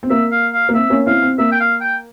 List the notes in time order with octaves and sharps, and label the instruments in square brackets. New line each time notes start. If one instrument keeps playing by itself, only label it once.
[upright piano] C4
[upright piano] A#3 [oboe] E5
[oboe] F5
F5
[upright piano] A#3
[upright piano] C4 [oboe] E5
[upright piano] A#3 C#4
[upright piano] C4 E4 [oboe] F5
[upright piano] C4
[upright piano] A#3 [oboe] E5
[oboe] G5
F5
G5